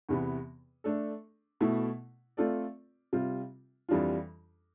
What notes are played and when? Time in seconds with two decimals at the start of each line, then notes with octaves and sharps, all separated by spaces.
0.09 E2 C3 E3 B3
0.84 A3 D4 A4
1.61 B2 A3 E4
2.37 A3 C4 F4 A4 D5
3.13 C3 G3 C4 F4
3.89 F2 E3 G3 D4 F4